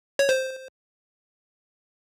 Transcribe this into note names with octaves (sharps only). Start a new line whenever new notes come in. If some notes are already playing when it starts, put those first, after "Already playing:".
C#5
C5